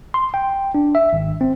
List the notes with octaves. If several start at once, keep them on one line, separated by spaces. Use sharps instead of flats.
C6
G5
D4
E5
G#1
C4